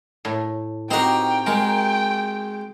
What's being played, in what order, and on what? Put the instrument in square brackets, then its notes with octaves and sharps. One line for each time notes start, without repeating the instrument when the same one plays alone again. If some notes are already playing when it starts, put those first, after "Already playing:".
[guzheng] A2
[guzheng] C4 F#4 G4 [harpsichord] D#4 A#4 [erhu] G5
[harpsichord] G#3 [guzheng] A#4